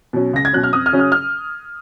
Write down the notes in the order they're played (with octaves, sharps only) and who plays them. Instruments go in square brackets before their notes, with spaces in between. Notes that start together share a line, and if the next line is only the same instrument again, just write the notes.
[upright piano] B2 F#3 C#4
C#2 A#6
G#6
B2 F#3 C#4 F#6
F6
F2 D#6
F6
C#3 F#3 C#4
F6
F6